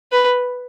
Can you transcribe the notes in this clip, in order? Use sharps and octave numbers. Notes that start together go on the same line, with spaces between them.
B4